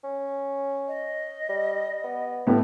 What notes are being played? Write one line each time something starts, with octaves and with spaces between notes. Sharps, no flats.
C#4
D#5
G3
B3
A2 B3 G4